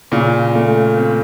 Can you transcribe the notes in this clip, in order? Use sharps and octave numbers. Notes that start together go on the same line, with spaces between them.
A#2 C#3
A3
C4